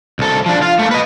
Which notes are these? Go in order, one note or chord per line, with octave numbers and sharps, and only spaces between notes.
C2 A4
F3 D4
F4 F5
A3 A#3
B4 D#5